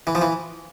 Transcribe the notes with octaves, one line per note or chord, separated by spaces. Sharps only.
E3
F3
E3